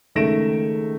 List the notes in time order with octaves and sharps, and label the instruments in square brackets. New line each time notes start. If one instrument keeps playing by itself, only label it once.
[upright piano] C#2 D#3 A3 A#6 D7 E7